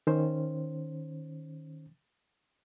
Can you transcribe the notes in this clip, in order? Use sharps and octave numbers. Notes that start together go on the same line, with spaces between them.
D#3 C#4 C5